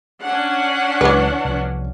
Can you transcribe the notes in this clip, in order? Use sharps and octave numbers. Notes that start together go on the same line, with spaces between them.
C#4 D4 F#5
C#2 E3 F#3 G#3 B4
C2 F3